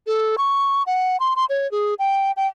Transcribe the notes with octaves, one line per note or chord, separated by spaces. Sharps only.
A4
C#6
F#5
C6
C6
C#5
G#4
G5
G5